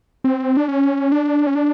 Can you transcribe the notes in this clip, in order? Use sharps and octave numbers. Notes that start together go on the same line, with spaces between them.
C4
D4
C#4
D4
C#4
D4